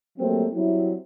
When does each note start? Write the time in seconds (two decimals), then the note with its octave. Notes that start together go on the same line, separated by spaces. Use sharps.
0.19 F#3 G3 A3 A#3 C4
0.54 F#3 G3 C4 E4